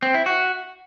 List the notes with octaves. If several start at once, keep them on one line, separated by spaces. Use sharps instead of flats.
C4
E4
F#4